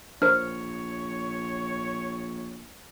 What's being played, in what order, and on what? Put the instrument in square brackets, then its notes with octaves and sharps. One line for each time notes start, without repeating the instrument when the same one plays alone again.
[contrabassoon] A#1 [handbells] D4 A#4 C5 [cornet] C#5 [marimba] F6